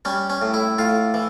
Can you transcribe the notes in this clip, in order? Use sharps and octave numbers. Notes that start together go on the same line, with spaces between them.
G3 C#4
C#4
A2
E4
A2 F4
E3